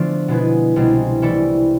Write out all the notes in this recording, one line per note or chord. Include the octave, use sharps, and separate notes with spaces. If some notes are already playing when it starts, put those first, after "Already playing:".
Already playing: D3 F3 A3 B3 D4 F4
B2 G#3 B3 E4 B4
C2 B2 G#3
E3 A3 E4 A4 D5